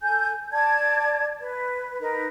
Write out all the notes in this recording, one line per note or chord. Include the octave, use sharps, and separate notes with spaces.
A4 G#5 G6
D5 A5 G#6
B4
D#4 A#4 B4